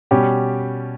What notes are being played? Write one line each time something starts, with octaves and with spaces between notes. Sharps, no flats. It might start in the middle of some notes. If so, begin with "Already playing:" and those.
B2 G3 C#4 G4